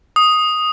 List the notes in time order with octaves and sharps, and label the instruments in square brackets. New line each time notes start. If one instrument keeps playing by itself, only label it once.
[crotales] D#6